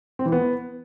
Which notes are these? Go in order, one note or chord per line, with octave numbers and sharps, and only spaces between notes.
C4
E3
B3